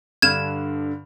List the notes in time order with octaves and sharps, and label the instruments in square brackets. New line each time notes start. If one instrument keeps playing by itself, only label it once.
[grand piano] G2 D3 F6 [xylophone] G#6 E7